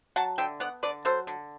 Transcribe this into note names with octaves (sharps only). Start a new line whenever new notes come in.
F#3 F#5 A5
D3 E5 G5
B3 D5 F#5
D3 B4 D5
F#3 A4 C5
D3